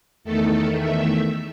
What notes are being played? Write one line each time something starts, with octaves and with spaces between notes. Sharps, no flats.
E2 D#3 A3 A4
E5